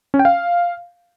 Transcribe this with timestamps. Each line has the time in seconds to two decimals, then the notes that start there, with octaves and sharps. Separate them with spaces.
0.14 C#4
0.19 G5
0.25 F5